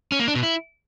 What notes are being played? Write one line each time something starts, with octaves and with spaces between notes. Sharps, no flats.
C#4
A#3
D4
B2
E4